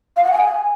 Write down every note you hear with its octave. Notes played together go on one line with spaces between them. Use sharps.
F5
F#5
G#5